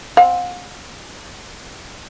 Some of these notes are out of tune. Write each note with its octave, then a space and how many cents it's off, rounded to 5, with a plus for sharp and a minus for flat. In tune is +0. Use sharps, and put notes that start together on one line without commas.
C4 +0 F5 +45